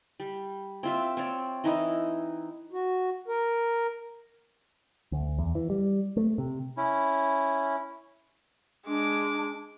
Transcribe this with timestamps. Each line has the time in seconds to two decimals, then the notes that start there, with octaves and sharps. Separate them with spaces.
0.20 G3
0.83 C4 F4 E5
1.17 C4 C#5 D5
1.64 E3 D#4 E4 D#5
2.72 F#4
3.28 A#4
5.12 D2
5.39 E2
5.55 E3
5.70 G3
6.17 A3
6.38 C3
6.77 C#4 E4
8.87 G#3 D4 D6